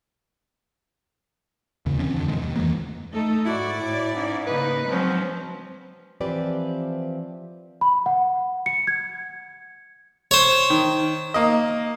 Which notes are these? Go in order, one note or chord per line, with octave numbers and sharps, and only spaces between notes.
D#2 C#3
D#3 F3 C4 C#4
F2 D3 D4
F#2 B2 D#3 G#3
D#2
F2 E3 G#3 A#3
A3 D#4 A4
G#2 E4 F#4 D5
A2
G#2 C#4
C#3 A#3 D#4 B4
F3 F#3 G#3 C4 C#4
E3 F3 C4 G4 B4 D5
B5
F#5
C#7
G#6
C5 C#5
D#3
A#3 D#5